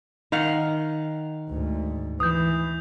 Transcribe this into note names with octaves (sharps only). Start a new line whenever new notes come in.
D#3 F5 F#5
D2 G#2
E3 D#6 G6